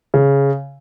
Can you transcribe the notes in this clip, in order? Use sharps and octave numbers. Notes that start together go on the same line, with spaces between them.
C#3